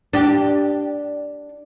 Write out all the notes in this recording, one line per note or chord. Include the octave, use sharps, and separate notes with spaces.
D4 G4